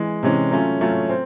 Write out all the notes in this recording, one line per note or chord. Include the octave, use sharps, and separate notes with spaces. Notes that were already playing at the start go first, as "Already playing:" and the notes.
Already playing: E3 G#3
C3 E3 G#3 C#4
F#3 A3 C#4 F4
F#3 A3 C#4 F4
C4